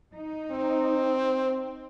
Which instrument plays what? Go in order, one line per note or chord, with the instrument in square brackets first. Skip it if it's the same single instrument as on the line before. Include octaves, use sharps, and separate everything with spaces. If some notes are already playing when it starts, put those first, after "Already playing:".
[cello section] D#4
[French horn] C4